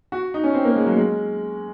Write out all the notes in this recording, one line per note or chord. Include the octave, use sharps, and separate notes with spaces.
F#4
D#4
C#4
C4
A#3
G#3
F#3
G#3